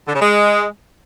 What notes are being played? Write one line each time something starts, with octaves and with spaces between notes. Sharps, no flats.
D3
C#3
G#3